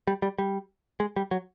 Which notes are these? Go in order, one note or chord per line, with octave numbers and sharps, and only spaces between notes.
G3
G3
G3
G#3
G3
F#3